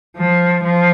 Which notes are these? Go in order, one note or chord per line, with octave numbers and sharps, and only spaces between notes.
F3
F3